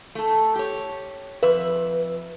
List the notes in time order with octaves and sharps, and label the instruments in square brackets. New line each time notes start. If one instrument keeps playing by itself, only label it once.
[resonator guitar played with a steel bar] A3 A4
G4 C#5
[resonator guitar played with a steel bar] F2 E5 [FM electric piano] B4